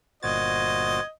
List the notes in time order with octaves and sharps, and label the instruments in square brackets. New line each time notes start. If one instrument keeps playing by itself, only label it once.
[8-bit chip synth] G1 A#2 A6 [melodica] F#4 C5 [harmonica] D#5 [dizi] G#6